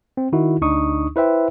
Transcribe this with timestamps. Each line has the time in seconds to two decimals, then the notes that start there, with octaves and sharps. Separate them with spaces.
0.17 C4
0.33 D#3 D#4 E4 F#4
0.61 D2 D4 D#4 C#6 D#6
1.16 E4 B4 C5 E5 G5